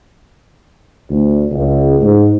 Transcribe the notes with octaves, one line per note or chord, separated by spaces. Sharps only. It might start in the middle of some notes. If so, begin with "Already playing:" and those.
D2
C#2
G#2